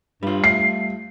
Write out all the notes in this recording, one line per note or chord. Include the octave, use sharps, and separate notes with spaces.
G2 G3 F4
A3 C7